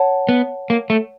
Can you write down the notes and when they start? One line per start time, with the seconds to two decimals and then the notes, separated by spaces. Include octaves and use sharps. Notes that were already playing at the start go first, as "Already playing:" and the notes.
Already playing: C#5 F#5 A5
0.29 B3
0.70 A#3
0.90 A3